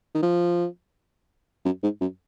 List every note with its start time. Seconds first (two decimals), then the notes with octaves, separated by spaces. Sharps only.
0.14 D#3
0.22 F3
1.65 F#2
1.83 G#2
2.01 F#2